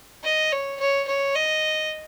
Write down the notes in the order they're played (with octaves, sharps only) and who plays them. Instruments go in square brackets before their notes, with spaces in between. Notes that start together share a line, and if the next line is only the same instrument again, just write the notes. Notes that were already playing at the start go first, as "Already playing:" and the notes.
[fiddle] D#5
C#5
C#5
C#5
D#5